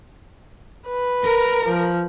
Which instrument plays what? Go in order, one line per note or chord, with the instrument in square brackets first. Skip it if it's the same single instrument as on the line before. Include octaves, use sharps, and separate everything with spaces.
[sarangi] B4
[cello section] A#4
[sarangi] F3